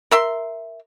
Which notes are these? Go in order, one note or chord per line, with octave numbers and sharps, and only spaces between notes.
A#4 E5 C6